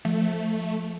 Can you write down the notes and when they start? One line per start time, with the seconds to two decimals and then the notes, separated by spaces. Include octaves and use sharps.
0.05 F3 A3